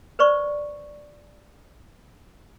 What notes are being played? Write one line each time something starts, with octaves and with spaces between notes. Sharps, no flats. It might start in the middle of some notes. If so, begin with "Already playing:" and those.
B4 C5 D5 C#6